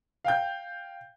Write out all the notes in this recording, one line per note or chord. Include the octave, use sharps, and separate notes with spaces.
F5 G5 G6